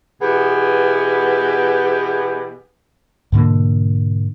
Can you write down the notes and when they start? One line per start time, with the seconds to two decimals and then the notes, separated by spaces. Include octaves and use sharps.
0.21 B2 E3 B3 G4 G#4
3.32 G#2 B2 D3 A#3